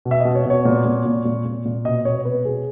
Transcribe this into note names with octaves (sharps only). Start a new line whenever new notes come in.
B2
E5
B2 D#5
C#5
B2 C#5
A#2
A#2
A#2
A#2
A#2
A#2
B2 D#5
B2 C#5
B2 B4
B2 G#4